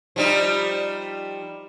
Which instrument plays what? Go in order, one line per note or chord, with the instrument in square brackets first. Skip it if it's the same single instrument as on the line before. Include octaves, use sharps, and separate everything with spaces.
[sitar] F3 G3 D#4